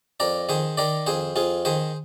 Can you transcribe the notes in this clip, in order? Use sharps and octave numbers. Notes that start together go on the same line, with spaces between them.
F2 A#4 D5
D#3 G#4 C5
D#3 A#4 D5
F2 G#4 C5
F2 F4 G#4
D#3 G#4 C5